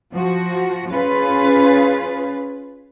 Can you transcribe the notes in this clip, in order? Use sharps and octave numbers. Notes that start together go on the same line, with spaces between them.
F3 F#4
C#4 F4 G#4 B4